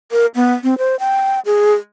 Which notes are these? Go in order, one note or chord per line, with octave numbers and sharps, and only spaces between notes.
A#4
B3
C4
C5
G5
G#4